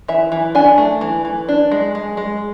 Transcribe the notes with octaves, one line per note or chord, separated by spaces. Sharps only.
E3 E5
E3
D4 G#5
A3
E3
E3
D4
G#3
G#3
G#3